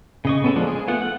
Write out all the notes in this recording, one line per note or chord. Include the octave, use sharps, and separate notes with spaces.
C#3 D#5 C#6
B3 C#4 G#4 A4
F3 G#3 A#3 D4
G#4
A3 B3 F4 F#5
F#5